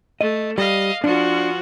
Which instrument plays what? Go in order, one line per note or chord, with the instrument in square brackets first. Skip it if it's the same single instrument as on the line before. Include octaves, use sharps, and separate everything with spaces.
[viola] A3 [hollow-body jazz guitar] D#5
[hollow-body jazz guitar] G3 [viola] D#5 F5
[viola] F3 F#4 [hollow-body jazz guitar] D4